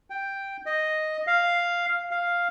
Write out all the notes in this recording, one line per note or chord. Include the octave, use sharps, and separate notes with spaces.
G5
D#5
F5
F5